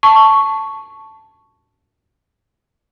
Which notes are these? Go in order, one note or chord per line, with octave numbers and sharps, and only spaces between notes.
A5 C#6